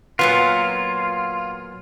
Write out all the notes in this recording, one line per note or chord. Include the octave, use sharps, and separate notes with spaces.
A#2 F#3 B3 F4